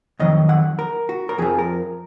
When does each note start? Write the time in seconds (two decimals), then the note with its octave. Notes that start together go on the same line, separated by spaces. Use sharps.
0.19 F2 D#3 F#3 D#5
0.49 F#5
0.79 A#4
1.09 F#4
1.29 A#4
1.38 F2 F3 G#4
1.59 A#4